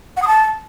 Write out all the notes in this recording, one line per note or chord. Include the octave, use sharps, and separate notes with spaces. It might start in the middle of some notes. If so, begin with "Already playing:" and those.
F#5
D#6
A5